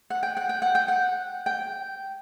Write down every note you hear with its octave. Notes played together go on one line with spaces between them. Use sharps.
F#5
G5
F#5
G5
F#5
G5
F#5
G5